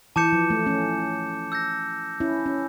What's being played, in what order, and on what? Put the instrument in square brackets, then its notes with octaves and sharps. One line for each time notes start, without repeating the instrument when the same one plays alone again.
[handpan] E3 [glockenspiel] A5 D6 G6 C#7 E7
[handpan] F3
A3
A3 C#4
[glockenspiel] E6 G6 A#6
[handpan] C#4 E4
C#4